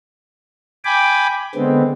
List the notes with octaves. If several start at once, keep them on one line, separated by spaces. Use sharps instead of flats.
G5 G#5 B5 D6
D3 G#3 B3 C4